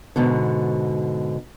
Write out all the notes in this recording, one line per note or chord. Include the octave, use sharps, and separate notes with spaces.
G#2 B2 D3